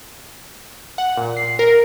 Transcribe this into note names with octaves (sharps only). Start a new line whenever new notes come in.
F#5
A#2
C7
A#4